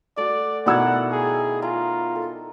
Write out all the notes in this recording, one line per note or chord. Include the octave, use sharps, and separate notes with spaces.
A3 F#4 D5
B2 D#3 E4 D5 F#5 E6 G#6
G#4
F4 A#5
A4